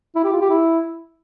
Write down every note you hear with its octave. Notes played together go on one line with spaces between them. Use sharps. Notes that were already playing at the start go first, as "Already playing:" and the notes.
E4
G4
F4
G4
E4